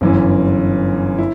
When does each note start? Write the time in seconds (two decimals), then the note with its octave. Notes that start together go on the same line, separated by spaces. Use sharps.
0.01 G1 F#2 E3
1.18 E4